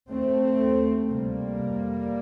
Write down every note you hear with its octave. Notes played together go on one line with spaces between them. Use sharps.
D#2 A3 C4
D#2
D2 C3 G3 A#3
F2 C3